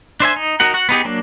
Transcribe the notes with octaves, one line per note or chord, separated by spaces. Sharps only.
D4 C5 E5 G#5
D#4
D#4 F#4 A#4 F#5
F#4 F#5
B3 D#4 G4 G#4
F#3 A#3 D4